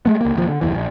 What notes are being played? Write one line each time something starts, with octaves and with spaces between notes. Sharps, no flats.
G#3 A3 B3
C#2 A#3
D#1 A#2 F3
D3
F#1 D#2 E3
A#1